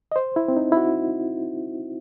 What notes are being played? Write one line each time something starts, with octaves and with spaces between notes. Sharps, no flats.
D#5
C5
E4
C4
D#4
E4
F#4